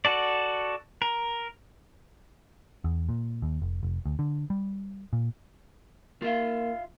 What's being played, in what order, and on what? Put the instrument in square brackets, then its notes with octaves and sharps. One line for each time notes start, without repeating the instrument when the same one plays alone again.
[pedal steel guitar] F#4 A4 D5
A#4
[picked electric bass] E2
A#2
D#2
F1
F1
D2
D3
G3
A#2
[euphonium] A#3 [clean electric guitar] F4 E5 F5